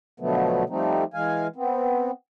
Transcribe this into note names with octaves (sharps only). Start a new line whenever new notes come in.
B2 D3 F3 F#3 A3 B3
F3 G3 A3 C4 D#4
E3 G#3 F5 G#5
B3 C4